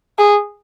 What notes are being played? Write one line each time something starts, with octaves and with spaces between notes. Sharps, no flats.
G#4